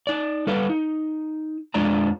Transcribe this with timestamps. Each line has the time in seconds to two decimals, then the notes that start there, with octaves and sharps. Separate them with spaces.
0.07 D#4 D5
0.47 G3 A4 B4 F5
0.69 D#4
1.74 F2 F3 G#3 D4 D5 A#5